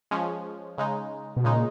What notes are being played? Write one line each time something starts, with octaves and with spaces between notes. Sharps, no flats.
F3 G#3 C#4
C#3 G#3 D#4
B2
A#2 C#3 G#3 D#4